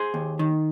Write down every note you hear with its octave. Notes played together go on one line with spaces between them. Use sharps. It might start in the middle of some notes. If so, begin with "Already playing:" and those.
Already playing: G#4 C5
D#2
D#3